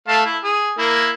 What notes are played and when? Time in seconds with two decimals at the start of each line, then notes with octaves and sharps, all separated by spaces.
0.08 A3 F5 A5
0.25 E4
0.44 G#4
0.78 A#3 E4